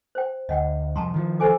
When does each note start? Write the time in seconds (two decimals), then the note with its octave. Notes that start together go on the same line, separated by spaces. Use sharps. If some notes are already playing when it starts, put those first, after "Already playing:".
0.15 C5 G5
0.49 D2 D#5 F#5 G5
0.96 C2 F2 A5 A#5 C6
1.14 D#3 F3
1.40 A4 C5 G#5 D6